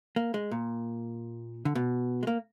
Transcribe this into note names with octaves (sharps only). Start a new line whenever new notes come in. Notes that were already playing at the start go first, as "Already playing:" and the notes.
A#3
G#3
A#2
D3
B2
G#3
A#3